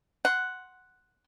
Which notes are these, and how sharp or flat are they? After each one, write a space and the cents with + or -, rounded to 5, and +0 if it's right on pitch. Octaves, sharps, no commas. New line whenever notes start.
F#5 +0 C6 +0